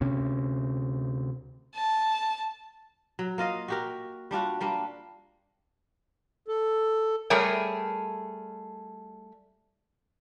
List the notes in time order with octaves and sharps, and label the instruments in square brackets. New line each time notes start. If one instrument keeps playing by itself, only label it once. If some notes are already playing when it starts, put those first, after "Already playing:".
[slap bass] D2 C3 C#4
[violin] A5
[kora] F#3
A#3 F4 D#5 F5
F#4 G4 A#4
G3 D4 F4 F#4
G3 A#3 D4
[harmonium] A4
[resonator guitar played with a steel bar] G3 A3 G#4 A#4 C#5